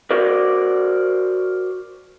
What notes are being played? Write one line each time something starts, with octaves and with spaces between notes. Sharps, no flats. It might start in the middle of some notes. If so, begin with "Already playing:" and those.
F#4 A#4 C5 D5